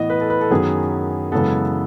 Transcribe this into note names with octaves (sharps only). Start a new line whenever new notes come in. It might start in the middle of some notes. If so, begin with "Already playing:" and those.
Already playing: A2 E3 B3 D#5
B4
A4
B4
A4
F#2 D#3 F#3 B3 G#4
F#2 C#3 E3 G#3 B3 A4